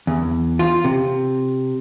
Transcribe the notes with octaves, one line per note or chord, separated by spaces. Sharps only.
E2
F4
C3